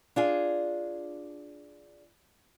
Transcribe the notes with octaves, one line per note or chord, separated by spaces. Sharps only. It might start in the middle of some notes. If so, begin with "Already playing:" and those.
D4 F4 G#4